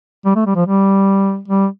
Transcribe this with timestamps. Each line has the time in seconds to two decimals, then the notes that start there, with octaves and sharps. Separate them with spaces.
0.25 G3
0.35 A3
0.47 G3
0.56 F3
0.66 G3
1.48 G3